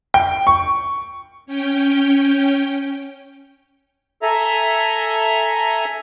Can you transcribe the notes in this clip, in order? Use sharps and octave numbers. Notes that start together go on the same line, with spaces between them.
G5
C#6
C#4 G5
A4 E5 G#5 A#5